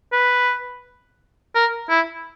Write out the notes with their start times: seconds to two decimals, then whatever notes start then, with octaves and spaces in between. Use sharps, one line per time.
0.12 B4
1.55 A#4
1.90 E4